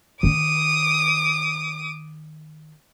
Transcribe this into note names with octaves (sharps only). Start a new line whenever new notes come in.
D#3 D4 D6 D#6